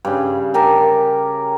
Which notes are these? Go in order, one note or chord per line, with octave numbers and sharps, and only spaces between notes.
G2 C#3
G4 A#4 G#5 A5